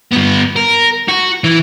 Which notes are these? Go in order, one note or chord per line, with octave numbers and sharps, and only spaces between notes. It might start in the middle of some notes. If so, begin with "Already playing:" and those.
G2 B3
A#4
F#4
E3